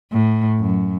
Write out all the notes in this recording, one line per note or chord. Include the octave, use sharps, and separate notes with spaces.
A2
F#2